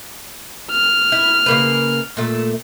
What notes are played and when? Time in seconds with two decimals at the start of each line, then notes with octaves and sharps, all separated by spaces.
0.71 F6
1.12 E4
1.46 C#3 A#3 B4
2.17 A#2 A3